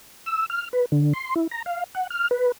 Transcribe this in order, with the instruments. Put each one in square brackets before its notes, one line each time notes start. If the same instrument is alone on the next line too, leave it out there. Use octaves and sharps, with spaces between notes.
[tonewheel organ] E6
F6
B4
D3
C6
E4
A#5
F5
F#5
F6
B4